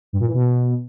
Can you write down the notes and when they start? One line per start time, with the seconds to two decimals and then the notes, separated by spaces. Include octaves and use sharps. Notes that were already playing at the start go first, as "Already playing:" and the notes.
0.13 G2
0.20 A#2
0.27 E3
0.34 B2